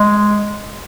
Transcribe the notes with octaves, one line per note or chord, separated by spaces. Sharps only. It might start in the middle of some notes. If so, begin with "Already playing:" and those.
Already playing: G#3